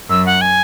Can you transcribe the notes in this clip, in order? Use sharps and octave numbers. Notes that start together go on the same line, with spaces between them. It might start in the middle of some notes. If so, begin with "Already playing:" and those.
F#2 E6
F#5
G#5